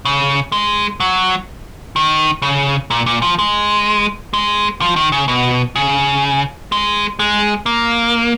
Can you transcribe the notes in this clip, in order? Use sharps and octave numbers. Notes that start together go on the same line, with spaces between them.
C#3
G#3
F#3
D#3
C#3
A#2
A#2
F3
G#3
G#3
F3
D#3
C#3
B2
C#3
G#3
G#3
A#3